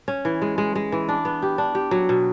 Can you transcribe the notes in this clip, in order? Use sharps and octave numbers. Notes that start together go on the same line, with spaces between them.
C#4
E3
G#3
G#3
G#3
E3
D4
B3
G4
D4
G4
F#3
B2